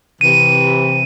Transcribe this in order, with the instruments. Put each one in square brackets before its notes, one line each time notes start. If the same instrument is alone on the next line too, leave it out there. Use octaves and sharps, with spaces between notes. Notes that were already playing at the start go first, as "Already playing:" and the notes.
[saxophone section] C3 E3 [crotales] D#7